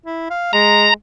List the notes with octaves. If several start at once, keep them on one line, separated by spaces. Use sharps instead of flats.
E4
F5
G#3 A#5